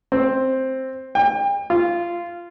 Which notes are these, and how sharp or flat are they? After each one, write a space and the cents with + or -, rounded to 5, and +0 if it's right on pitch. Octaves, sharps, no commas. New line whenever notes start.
C4 +5
G5 +35
F4 -15